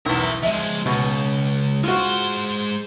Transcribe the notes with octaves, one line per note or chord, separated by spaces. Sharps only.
B1 E2 A#4 E5
F3 G#3 D#5 E5
C#2 B2
G#3 F4 F#4 C5